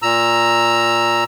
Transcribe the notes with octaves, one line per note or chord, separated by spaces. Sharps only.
A#2 A#5 E6